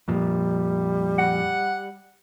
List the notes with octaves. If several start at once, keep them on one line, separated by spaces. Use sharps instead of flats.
F2 A#2 F3 G3
F#5